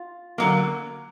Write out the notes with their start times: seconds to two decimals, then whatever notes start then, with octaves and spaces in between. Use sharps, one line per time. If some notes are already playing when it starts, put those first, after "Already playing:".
Already playing: F4
0.38 D3 F#3 A#3